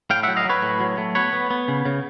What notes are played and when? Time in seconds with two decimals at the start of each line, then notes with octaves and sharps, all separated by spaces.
0.10 A2 F5 G5
0.23 E5 F#5
0.28 F#3
0.37 D#5 F5
0.45 F#3 B4 C#5
0.62 A2
0.80 F#3
0.98 A3
1.15 B3 B4 C#5
1.33 B3
1.51 B3
1.68 C#3
1.85 C#3